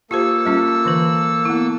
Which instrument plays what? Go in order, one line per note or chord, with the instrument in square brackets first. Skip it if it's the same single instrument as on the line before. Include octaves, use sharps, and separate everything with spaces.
[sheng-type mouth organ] A#3 A4 E6 [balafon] F4 G4 C5
[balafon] G3 C#4 F4
D3 E3 B4
B3 E4